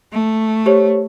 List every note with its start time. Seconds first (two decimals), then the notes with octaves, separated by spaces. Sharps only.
0.12 A3
0.66 G4 C5 C#5